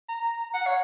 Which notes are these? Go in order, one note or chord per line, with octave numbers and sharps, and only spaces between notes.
A#5
F#5
C#5